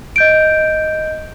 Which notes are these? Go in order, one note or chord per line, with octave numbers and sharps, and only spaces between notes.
D#5 G6 D7